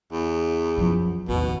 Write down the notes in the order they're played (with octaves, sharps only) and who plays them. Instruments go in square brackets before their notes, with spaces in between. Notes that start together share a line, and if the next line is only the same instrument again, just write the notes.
[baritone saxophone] E2
[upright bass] F#2 F3
[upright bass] A1 D#2 [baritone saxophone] B2